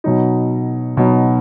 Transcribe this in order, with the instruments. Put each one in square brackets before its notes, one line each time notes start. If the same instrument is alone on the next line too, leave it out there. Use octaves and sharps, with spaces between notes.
[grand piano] B2 F#3 D#4
B2 F#3 D#4